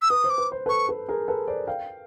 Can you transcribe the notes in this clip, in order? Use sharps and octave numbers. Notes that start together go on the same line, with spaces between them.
E6
B4 D#6
C5
D6
B4
C5
A4 B4 C#6
A4 B4
G#4 A#4
A4 B4
C5 D5
F5 G5